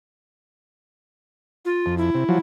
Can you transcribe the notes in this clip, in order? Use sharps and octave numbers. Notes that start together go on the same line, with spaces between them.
F4
F2
E4
C3
F3 F#3